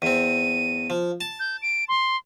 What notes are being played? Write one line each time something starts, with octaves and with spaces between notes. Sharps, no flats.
E2 C4 D#7
F3
A5
G6
D7
C6